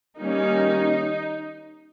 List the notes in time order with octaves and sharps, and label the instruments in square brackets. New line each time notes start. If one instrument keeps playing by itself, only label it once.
[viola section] D#3 G3 A#3 C#4 D#4